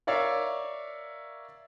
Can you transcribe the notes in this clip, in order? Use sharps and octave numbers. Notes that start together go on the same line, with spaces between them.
A#4 C#5 D5 E5 F5